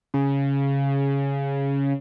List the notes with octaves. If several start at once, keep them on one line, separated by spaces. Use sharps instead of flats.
C#3